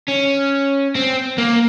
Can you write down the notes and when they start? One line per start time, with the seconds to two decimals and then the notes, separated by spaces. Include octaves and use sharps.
0.08 C#4
0.95 C4
1.38 A#3